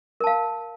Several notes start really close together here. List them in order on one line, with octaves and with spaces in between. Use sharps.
A#4 A5 F5